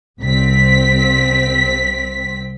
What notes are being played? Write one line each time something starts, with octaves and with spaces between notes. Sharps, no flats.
C2 C4 B6